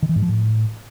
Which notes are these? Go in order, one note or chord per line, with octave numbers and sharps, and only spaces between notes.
D#3
E3
G#2
F3
A2